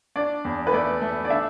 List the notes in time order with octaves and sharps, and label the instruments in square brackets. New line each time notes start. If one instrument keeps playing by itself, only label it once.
[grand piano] D4 [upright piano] D5
[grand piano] E2
[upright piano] B4
[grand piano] A3 [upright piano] D5
[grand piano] A3
[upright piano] D5
[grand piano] D4 [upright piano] E5